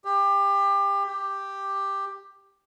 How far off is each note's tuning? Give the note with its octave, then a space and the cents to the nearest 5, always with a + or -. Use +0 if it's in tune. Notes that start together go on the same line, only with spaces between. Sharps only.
G4 +25
G4 +5